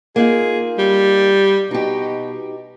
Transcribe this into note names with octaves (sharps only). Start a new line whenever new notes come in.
A#3 D#4 F4 G#4
G3
B2 D#4 G4